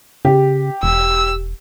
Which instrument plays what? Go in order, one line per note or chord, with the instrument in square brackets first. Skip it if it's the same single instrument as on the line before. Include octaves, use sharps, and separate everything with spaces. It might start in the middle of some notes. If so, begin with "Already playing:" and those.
[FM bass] C#3 [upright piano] G4
[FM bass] E1 [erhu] E6